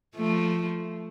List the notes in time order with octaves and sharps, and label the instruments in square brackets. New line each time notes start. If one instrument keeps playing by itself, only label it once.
[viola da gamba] F3 A3